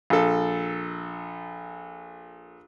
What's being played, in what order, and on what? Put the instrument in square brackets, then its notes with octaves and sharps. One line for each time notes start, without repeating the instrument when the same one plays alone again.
[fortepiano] A#1 A4